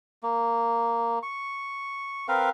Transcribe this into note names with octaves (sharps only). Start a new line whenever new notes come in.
A#3
C#6
C4 A#4 B4 F5